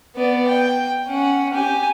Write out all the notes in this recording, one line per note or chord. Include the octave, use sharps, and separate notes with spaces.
B3 D5
G5
C#4 F#5
G4 G#5